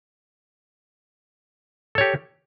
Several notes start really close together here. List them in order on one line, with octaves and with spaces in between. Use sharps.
A4 C#5 G4